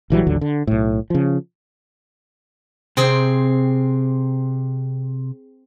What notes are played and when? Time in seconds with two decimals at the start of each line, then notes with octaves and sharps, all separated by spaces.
0.10 A#1 E3 F#3 G3
0.27 A1 D#2 D3 F#3
0.41 D3
0.67 B1 A2
1.10 C#3 F3
2.97 C3 C4 G#4 G5